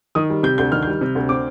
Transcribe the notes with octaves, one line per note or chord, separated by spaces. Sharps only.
D#3 D#6
G3
C3 G6
D2 G6
D#3 F6
G6
G3
C3
D2
C4 D6